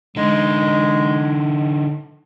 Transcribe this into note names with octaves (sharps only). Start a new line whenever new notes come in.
D3 G#3 D#4